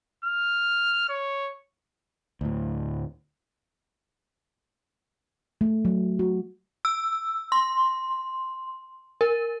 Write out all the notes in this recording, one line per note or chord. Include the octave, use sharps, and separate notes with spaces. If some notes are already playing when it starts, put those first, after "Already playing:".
F6
C#5
D2 A2
A3
F#3
F#4
E6
C6
A#4